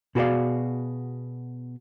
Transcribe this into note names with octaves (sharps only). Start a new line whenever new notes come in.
B2 F#4 G#4 A4 D5 F5